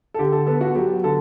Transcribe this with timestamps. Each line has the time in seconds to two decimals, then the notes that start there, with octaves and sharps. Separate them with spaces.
0.14 A4
0.19 D3 G4
0.32 A4
0.47 B3 A4
0.61 F#4
0.75 F#3 G4
1.04 D3 A4